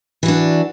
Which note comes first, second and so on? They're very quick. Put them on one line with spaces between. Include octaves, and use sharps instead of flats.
E3 F#4 D4